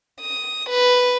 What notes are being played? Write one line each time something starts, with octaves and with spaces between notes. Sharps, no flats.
D#6
B4